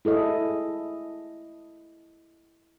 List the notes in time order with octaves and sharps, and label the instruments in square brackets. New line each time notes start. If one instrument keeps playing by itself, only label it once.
[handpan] E4 G#4 A4 D#5